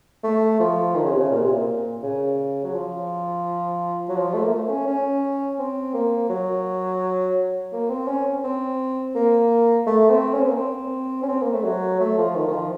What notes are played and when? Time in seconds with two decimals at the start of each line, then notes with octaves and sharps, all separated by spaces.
0.24 A3
0.60 F3
0.95 D#3
1.04 C#3
1.12 C3
1.20 C#3
1.31 A#2
1.42 C3
1.52 A#2
2.03 C#3
2.64 F#3
2.74 F3
4.09 F#3
4.16 F3
4.34 A3
4.44 A#3
4.51 A3
4.69 C#4
4.87 C#4
5.59 C4
5.94 A#3
6.30 F#3
7.73 A#3
7.90 C4
8.08 C#4
8.44 C4
9.15 A#3
9.86 A3
10.10 C4
10.34 C#4
10.41 C4
10.48 A#3
10.56 C4
11.23 C#4
11.28 C4
11.42 A#3
11.53 A3
11.64 F#3
12.00 A3
12.18 F3
12.35 D#3
12.48 D#3
12.53 F3